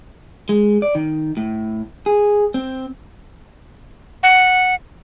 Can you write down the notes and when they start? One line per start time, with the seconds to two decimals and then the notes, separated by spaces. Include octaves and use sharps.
0.49 G#3
0.82 D5
0.95 D#3
1.37 A2
2.06 G#4
2.54 C4
4.23 F#5